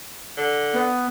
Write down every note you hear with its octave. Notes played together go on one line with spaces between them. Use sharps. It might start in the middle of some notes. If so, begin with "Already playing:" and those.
D3
B3